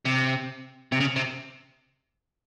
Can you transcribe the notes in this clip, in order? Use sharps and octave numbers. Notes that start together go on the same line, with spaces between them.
C3
C3
C#3
C3